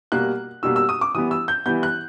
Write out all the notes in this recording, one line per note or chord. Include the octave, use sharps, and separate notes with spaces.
B2 G3 A#3 F#6
B2 G3 A#3 E6
E6
D#6
D6
E3 G3 B3 D#6
E6
G6
E3 G3 B3 G6
F#6